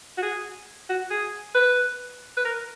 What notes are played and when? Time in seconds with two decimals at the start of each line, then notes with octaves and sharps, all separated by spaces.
0.18 F#4
0.22 G#4
0.89 F#4
1.10 G#4
1.55 B4
2.37 B4
2.45 A#4